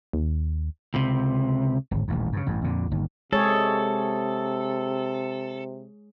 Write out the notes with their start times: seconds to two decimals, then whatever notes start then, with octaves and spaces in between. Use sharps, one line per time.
0.13 D#2
0.94 C#2 C3
1.91 D1 G#1
2.08 D#1 A1 D#2
2.33 G2 C#3
2.47 A1 G2
2.64 F2 A#2 D3
2.91 G1 D#2
3.33 C3 G#3 G#4 A4 C#5